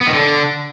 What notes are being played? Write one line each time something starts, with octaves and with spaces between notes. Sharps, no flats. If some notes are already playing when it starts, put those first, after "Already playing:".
B3
D#3
D3